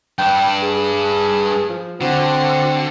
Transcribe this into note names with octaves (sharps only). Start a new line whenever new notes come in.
G2 D4 G5
G#4
F3
D3 C4 F#4